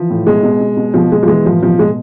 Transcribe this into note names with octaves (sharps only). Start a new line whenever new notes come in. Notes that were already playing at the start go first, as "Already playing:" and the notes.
Already playing: E3 F3
A2
B2 G#3
B2
B2
B2
B2 F3
B2 G#3
F3
E3 G#3
A2 F3
B2 F3
B2 G#3